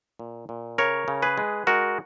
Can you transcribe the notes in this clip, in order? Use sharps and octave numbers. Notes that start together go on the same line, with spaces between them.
A#2
A#2
C#3 A#4 C#5
C#3
G#4 B4
G#3
G#3 F#4 A#4